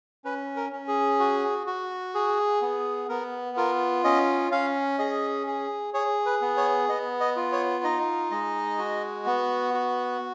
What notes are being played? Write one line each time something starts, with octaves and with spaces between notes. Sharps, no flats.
C#4 B4
A#4
C#4
G#4
F#4
F#4
G#4
B3
B3 A#4
F4 A#4
C#4 D#5
C#4 F5
G#4 D#5
G#4
G#4 C#5
B4
B3
C#5
B3 D#5
D#5
F4
C#5
D#4 D#5
G#3 D#5
F#4
B3
F#4